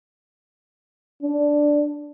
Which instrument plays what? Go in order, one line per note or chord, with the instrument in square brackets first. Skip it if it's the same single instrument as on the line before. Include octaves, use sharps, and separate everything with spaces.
[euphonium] D4